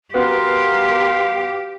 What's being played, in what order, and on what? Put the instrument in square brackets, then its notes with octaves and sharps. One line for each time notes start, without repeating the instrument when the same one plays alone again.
[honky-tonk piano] B3 F#4 [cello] G4 [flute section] A#4 C6 [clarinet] F5